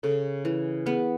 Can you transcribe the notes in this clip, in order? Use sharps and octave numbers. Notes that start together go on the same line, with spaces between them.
C#3 A4
E3
B3 G#4